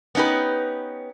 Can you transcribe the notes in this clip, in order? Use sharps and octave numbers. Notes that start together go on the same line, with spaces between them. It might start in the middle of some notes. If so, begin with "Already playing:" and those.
B3 C#4 D#4 G4 B4